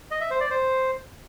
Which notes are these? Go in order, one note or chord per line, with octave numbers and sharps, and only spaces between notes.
D#5
E5
C5
D5
C5